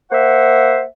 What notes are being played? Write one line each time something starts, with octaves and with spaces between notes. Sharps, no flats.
A#3 C5 E5 F#5